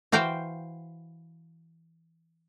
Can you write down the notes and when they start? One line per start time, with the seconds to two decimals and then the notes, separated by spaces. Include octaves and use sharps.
0.12 E3 F#4 C5 F5 G5